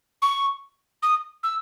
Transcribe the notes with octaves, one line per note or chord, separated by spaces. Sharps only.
C#6
D#6
E6